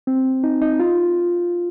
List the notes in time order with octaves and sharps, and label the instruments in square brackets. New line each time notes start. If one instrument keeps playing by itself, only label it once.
[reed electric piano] C4
D#4
D#4
F4